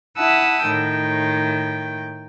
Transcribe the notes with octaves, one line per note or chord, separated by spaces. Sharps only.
E4 E5 F#5 A5 D#6 E6
A2 D#3 G5